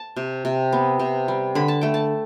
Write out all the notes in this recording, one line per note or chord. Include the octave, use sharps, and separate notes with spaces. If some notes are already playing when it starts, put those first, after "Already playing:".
Already playing: A5
C3
C3
B3
C3
G3
D3 B5
A5
A3 G5
A5